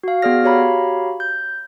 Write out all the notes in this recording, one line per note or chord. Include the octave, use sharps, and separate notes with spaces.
F#4 F5
B3 F#4 G#4 D5 F6 A#6
F#4 G4 C#5 F5 A#5 B5
G6